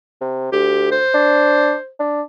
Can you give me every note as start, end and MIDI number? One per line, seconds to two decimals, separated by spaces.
0.21 0.52 48
0.52 0.99 38
0.52 0.87 67
0.92 1.90 72
1.14 1.74 62
2.00 2.22 62